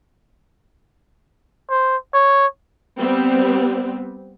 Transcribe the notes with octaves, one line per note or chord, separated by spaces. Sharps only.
C5
C#5
G3 B3 C4